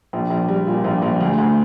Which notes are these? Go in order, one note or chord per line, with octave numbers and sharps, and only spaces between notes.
A#1
A#1
G3
A#2
A#1
A#1
D2
D2